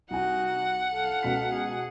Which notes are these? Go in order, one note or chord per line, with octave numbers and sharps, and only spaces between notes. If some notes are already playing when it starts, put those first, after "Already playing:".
C2 D#4 F#4 F#5 G#5
A4 F5
C#2 B2 B6
G#4